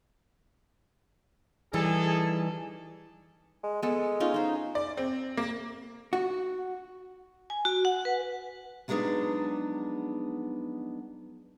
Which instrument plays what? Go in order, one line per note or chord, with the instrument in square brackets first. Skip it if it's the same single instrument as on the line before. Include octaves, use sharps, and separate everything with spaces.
[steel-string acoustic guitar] E3 G3 D#4 [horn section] G#4 A4
[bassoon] G#3
[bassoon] G#3 [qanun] B3 A4
[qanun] C#4 D#4 F4
D#4 C5
[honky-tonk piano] D5
C4
A#3
[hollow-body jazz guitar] F#4
[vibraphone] G#5
F#4
F#5
B4
[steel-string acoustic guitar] F3 F#3 G#3 B3 D4 D#4